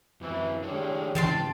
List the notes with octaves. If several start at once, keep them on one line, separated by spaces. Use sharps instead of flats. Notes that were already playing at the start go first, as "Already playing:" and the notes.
F#2 E3 F#3 C4
A2 G3 G#3 D4 G#4 C#5
G#2 C#3 E3 C4 G5 A5 C6